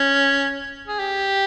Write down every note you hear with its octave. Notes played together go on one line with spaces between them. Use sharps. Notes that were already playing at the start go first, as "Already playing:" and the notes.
Already playing: C#4
G#4
G4